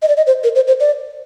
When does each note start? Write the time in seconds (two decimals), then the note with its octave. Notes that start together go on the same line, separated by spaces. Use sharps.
0.02 D#5
0.08 D5
0.17 D#5
0.27 C5
0.44 A#4
0.55 C5
0.68 C5
0.80 D5